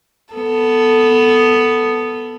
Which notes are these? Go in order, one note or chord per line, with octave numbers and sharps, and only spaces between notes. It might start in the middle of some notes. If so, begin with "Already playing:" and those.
B3 A4